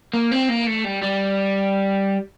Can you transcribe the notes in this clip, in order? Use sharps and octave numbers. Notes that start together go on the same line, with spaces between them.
A#3
C4
A#3
A3
G3
G3